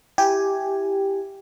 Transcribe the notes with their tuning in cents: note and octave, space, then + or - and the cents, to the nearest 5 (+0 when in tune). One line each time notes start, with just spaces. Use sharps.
E4 +0 G4 +0 G#5 +0